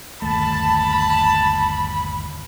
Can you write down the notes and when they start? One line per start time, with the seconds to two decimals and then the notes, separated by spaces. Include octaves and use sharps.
0.22 G1 D#2 A3 A5 B5